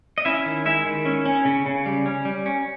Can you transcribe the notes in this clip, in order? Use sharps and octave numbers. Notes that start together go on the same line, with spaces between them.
D#5
C#4 E4 E5
D#3
G#3 E4 E5
D#3
C#4
C#4
C#3
C#3
G3
C#4
G3
C#4